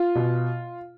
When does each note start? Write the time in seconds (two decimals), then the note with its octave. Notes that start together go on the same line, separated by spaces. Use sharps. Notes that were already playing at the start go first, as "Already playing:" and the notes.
Already playing: F4
0.15 B2